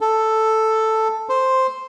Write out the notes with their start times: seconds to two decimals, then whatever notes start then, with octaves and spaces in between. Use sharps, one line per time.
0.01 A4
1.29 C5